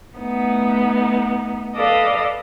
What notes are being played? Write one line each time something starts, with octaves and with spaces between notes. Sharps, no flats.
A3 B3 D#4
A4 B4 D5 D#5 F5